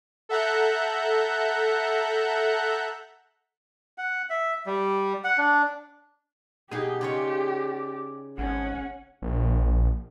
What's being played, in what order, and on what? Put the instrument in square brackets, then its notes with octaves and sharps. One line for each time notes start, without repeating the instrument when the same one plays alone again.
[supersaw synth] A4 E5 F#5 A#5 F#6 G6
[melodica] F#5
E5
G3
F#5
D4
[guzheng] B2 D#4 [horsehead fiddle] G4 [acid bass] G#4
[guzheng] C#3 F4 C#5 [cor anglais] D5
[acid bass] G#1 [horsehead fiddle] C#4 F#5
[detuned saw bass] A#1